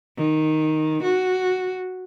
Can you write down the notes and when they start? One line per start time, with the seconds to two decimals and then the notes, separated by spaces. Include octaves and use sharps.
0.17 D#3
1.03 F#4